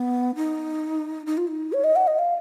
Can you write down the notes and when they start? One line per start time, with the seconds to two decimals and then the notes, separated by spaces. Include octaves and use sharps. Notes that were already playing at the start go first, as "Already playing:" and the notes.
Already playing: B3
0.36 D#4
1.27 D#4
1.37 F4
1.47 D#4
1.73 C#5
1.84 D#5
1.96 F#5
2.07 D#5
2.19 F5